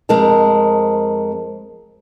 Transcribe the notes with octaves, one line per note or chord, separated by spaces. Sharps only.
F2 G#3 C4 A#4 A5